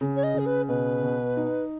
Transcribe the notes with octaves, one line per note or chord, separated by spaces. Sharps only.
C#3
C#5
D#5
C#3 G#4
B4
B2 B4
B2
D#4